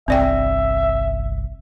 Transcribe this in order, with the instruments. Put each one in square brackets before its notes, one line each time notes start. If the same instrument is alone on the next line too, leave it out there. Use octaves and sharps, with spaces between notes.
[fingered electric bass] G1 C2 [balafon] C4 D5 G5 [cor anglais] E5